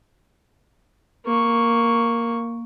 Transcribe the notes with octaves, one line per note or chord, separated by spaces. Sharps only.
A#3 C#6